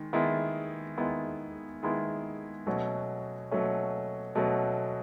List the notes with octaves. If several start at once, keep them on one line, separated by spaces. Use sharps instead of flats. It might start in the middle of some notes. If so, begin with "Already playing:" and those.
Already playing: D#3 G#3
D#3 G#3 B3 E4
D#3 G#3 B3 E4
D#3 G#3 B3 E4
B2 F#3 A3 C#4
B2 F#3 A3 C#4
B2 F#3 A3 C#4